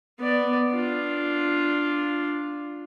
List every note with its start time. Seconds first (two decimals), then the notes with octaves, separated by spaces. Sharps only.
0.19 B3 D5
0.73 D4 F4